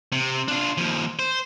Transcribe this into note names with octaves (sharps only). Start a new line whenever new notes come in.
C3
D4 F4
D#2 F3
C5